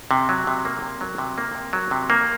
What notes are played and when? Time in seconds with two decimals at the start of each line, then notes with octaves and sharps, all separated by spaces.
0.11 C3
0.29 F#3
0.47 C3
0.65 A#3
0.82 C3
1.01 F#3
1.18 C3
1.38 A#3
1.55 C3
1.73 F#3
1.91 C3
2.10 A#3